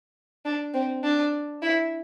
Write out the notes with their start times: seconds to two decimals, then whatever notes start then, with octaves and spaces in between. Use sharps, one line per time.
0.45 D4
0.74 C4
1.04 D4
1.62 E4